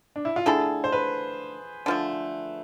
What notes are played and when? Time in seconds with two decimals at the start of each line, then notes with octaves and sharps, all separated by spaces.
0.16 D4
0.25 E4
0.36 F4
0.46 D3 A3 E4 G#4 A4
0.84 C5
0.92 B4
1.86 D3 F3 A3